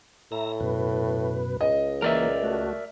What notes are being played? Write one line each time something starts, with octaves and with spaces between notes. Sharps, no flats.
A2 E5 A#5 A#6
F#2 B2 B4
C#2 D#5
E3 A#3 A#4 D5 E5
A3 F#4